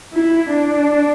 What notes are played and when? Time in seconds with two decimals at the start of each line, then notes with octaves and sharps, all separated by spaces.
0.13 E4
0.52 D4